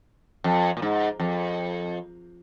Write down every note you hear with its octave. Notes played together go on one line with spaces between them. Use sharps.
F2
A#2
G#2
F2